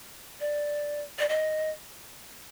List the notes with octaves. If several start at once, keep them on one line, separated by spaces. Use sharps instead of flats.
D5
D5
D#5